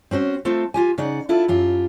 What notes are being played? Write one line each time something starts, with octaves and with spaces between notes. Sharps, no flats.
C4 C#4 F#4 C5
A3 C4 F4 A4
F4 G4 G#5
C#3 D#4 D5 F#5
D4 E4 F4 A4
F#2 F4 G4